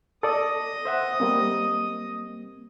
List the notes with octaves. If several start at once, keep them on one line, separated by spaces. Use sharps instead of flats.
A4 D5 D#5 D#6
C5 E5 F#5
G3 A#3 C4